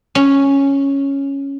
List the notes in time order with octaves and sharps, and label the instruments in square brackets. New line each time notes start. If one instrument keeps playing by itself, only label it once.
[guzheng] C#4